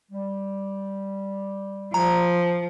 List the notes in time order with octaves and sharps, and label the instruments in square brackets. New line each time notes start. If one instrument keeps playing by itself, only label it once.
[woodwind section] G3
[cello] F3 [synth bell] A#5